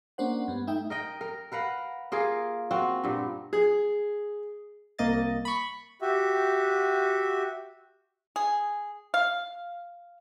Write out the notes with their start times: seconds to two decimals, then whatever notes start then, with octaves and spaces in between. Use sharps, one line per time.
0.18 A#3 C#4 D4 C5 F#5
0.48 G2 B3
0.67 A3 D#4 E5 G5
0.90 A#4 D#5 G5
1.21 A#4
1.52 A#4 B4 F5 F#5
2.12 A#3 F4 G#4
2.71 C4 F4 F#4
3.04 G2 A#2
3.53 G#4
4.99 C2 A#3 D#5 A6
5.45 B5 C#6
6.02 F#4 G4 E5
8.36 G#4
9.14 F5